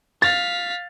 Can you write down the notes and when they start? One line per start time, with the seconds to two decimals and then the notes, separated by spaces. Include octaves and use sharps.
0.22 F5 A6 B6